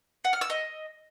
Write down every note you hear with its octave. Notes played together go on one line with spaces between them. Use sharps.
F#5
F6
E6
D#5